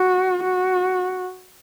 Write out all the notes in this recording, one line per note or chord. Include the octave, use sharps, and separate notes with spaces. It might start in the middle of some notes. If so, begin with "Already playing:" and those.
Already playing: F#4
F#4